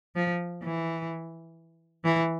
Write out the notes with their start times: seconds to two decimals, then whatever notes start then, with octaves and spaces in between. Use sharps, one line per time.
0.16 F3
0.63 E3
2.04 E3